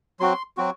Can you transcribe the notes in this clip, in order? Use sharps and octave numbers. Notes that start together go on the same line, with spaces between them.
F#3 C4 F#4 C6
F#3 C4 F#4